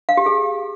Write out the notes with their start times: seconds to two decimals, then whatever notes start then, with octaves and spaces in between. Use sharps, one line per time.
0.09 F5
0.17 G4
0.26 G#4